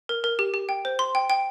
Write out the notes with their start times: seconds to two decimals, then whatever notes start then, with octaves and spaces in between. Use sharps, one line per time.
0.09 A#4
0.24 A#4
0.39 G4
0.54 G4
0.69 G5
0.85 C5
0.99 C6
1.15 G5
1.30 G5